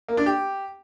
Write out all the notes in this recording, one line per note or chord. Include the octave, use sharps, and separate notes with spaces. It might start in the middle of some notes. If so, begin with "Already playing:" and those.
A#3
D4
G4